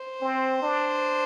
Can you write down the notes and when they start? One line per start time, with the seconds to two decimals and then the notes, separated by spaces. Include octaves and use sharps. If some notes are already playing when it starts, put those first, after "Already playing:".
Already playing: C5
0.21 C4
0.62 D4